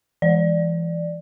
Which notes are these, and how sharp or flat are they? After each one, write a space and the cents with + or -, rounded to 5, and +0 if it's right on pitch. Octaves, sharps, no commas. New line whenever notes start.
E3 +30 D5 +10